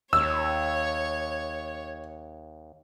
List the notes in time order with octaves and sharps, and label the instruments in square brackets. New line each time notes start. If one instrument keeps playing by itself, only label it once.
[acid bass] D#2 [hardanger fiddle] C#5 [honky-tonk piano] E6